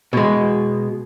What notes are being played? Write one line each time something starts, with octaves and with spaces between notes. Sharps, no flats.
B2 G#3